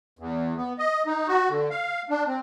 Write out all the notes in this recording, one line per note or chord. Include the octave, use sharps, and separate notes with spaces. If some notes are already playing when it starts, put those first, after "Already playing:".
E2
B3
D#5
D#4
F#4
D3
F5
D4
C4